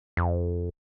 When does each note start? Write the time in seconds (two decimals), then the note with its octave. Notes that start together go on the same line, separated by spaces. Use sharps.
0.17 F2